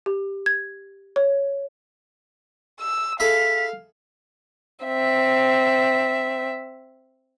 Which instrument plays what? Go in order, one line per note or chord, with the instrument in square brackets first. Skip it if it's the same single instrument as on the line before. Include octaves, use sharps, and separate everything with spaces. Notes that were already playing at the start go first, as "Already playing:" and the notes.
[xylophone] G4
G#6
C#5
[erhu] E6
[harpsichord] E4 G#4 A4 [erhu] F5 [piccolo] B6
[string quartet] C4 E5